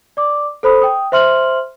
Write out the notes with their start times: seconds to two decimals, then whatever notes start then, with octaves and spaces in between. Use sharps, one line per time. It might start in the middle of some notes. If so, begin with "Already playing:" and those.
0.17 D5 D6
0.63 A4 C5 B5 D#6
0.82 G5 D#6
1.12 C5 E5 C6 F6 F#7